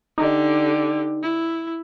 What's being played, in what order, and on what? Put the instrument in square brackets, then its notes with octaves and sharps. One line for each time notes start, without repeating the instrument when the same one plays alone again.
[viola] D3 G4 [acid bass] D#4
[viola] E4